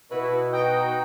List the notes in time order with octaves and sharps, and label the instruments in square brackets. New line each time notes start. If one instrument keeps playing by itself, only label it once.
[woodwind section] B2 [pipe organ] E4 F#4 [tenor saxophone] B4
[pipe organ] D#4 F#4 [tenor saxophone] D#5 [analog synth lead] G5